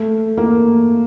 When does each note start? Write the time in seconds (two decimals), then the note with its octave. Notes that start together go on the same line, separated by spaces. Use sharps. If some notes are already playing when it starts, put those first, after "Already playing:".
Already playing: A3
0.37 A#3